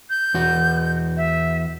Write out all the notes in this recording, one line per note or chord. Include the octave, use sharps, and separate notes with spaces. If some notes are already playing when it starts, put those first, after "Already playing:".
G6
E2 F#4
E5